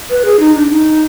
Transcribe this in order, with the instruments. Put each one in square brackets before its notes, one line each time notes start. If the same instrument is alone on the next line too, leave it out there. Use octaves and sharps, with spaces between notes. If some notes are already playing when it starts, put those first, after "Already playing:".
[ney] B4
G#4
D#4
D4
D#4